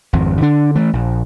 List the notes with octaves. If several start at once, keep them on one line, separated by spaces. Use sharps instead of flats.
G#1 F2
D3 D4
E3 A3
A#1